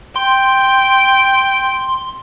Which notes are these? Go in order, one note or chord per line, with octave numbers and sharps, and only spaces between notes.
G5 C6